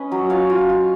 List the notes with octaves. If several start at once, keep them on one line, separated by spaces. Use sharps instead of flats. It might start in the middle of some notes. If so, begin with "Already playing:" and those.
Already playing: C#4 B4 D#5
F#3
F4 C#5 F5
F4
F4